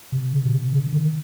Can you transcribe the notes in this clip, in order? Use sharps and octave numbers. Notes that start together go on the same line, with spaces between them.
C3
D3
A#2
C3
D3
D3
D#3